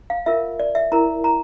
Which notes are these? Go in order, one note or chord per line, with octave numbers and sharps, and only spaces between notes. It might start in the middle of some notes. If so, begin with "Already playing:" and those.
F5
F4 A#4 E5
D5
E5
E4 A#4 A#5
A#5